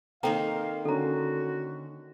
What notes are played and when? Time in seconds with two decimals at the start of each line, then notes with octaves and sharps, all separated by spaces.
0.23 D#3 A#3 C4 A4 F5 G5 A#5
0.85 D3 C#4 F#4 A4 A#5